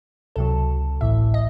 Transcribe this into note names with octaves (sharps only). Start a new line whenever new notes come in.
C#2 C3 F#3 A4
A1 A2 E3 E5
D#5